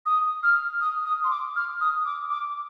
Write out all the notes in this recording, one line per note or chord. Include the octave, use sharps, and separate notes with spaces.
D#6
F6
D#6
D#6
C6
D6
F6
D#6
D6
D6